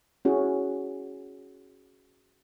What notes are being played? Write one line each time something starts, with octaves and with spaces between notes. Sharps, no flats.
C#4 E4 F#4 G#4